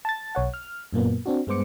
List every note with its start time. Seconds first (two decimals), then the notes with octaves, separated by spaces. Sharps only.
0.05 A5 A6
0.35 B1 C#5 F#5
0.54 F6
0.93 F#2 A#2 A#3 B3
1.26 C4 D4 F#4
1.47 G2 G#3 B3 C5 D6 C#7